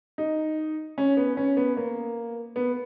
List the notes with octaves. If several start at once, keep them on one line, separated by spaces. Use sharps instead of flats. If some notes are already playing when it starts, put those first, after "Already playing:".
D#4
C#4
B3
C#4
B3
A#3
B3